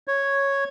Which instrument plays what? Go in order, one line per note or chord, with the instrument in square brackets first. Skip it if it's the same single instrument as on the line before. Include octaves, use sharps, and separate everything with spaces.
[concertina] C#5